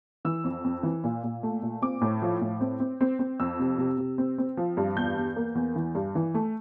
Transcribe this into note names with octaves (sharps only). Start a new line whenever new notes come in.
E3 E6
F2
F2
E3
A#2
A#2
A3
A#2
C4 D6
A2
F3
A2
C4
C4
C4
C4
F2 E6
C3
C3
C3
C4
C4
F3
G2
E2 G6
E2
A#3
E2
E3
G2
E3
A3